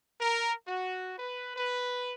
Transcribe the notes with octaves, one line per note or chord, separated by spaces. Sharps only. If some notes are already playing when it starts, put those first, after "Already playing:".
A#4
F#4
B4
B4